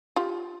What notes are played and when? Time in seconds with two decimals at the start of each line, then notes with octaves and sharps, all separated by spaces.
0.16 F4 G4